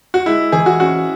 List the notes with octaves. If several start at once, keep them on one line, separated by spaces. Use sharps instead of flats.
F#4
G#3 E4
E3 G#4
F#4
C#4 F#4